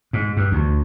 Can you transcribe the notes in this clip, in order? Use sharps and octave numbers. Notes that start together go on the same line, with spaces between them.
G#2
G2
D2